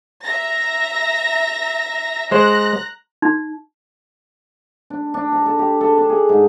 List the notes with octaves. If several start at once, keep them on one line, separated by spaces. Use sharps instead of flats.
E5 A#5 A#6
G#3 C5 A#5 F#6 A#6
D#4
D4
D4
A#5
A4
G4
A4
D4
G#4
G#2